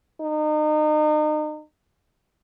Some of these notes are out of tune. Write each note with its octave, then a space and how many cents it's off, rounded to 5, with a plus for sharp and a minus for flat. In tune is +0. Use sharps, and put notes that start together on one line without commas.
D#4 -35